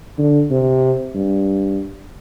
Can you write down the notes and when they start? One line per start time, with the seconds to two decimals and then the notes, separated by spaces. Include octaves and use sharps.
0.18 D3
0.51 C3
1.15 G2